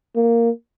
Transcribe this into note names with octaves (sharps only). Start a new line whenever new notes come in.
A#3